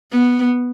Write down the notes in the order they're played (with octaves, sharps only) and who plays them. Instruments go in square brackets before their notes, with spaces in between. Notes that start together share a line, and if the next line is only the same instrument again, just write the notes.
[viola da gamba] B3